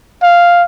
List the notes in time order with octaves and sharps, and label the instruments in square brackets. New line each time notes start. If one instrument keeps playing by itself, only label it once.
[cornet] F5